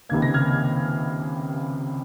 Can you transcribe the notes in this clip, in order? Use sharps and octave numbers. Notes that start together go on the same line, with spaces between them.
C#2 C3 D#3 A#3 G#6
A#6
F6 G#6